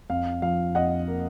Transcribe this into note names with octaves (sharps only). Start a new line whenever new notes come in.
F2 F5
F3 F5
F2 D#5 F#5
A#3